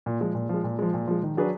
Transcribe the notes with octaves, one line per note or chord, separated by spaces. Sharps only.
A#2
F3 G#3
A#2
F3 G#3
A#2
F3 G#3
A#2
F3 G#3
D#3
F#3 D4 G#4 B4